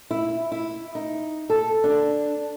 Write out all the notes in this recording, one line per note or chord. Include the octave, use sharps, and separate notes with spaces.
E4
E4
D#4
A4
D4